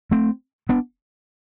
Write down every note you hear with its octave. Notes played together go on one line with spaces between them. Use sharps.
A3 C4
B3 D4